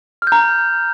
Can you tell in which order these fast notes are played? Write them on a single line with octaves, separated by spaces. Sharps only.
F6 G6 A#5